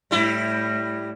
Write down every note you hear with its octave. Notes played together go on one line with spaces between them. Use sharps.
A2 G3 E4